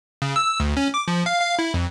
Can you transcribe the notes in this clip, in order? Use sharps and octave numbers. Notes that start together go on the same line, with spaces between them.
C#3
E6
D2
C#4
D6
F3
F5
F5
E4
F2